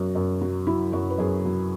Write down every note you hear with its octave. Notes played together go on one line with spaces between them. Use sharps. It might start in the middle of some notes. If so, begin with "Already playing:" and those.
Already playing: F#2 F#3 F#4
F#2
F#3
F#3 E4
F#2 F#4
B4
F#2 G#4
F#3